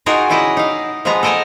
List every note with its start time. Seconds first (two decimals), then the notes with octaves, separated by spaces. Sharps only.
0.06 D#4 F4 F#4 G#4 A#4 G5
0.29 C#3 D#4 E4 D5 D#5
0.57 D#4 F5
1.05 F3 G#3 B3 G#4 A#5
1.23 A4 A#4 D#5 G5 G#5 A#5